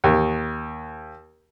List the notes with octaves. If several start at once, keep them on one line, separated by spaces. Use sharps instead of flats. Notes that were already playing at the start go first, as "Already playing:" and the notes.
D#2